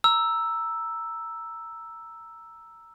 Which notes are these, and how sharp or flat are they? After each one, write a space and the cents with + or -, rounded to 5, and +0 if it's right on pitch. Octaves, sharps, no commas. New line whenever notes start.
A#5 +0 E6 +0